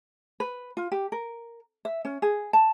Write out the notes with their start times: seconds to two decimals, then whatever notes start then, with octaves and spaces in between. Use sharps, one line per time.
0.40 B4
0.77 F4
0.92 G4
1.12 A#4
1.85 E5
2.05 C#4
2.22 G#4
2.53 A5